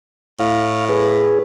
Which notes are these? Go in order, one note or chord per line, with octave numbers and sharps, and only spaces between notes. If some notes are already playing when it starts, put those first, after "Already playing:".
A2 F5
G#4 B4